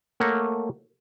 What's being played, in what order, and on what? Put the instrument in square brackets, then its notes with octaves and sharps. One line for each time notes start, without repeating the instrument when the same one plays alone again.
[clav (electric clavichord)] A3 A#3 C#5 F#5